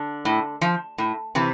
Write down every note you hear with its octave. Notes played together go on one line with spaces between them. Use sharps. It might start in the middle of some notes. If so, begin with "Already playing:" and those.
Already playing: D3 D4
A2
F3
A2
C3 E3 C4